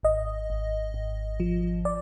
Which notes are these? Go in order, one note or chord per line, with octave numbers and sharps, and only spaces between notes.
G#1 D#5
G#1
G#1
F3
D5